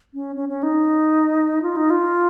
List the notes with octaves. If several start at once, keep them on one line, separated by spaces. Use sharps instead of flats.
C#4
C#4
C#4
D#4
F4
D#4
F4